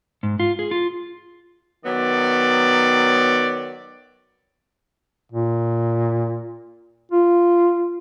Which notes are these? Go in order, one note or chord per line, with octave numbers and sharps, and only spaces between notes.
G#2
F4
G#4
F4
D#3 F#3 B3 D5
A#2
F4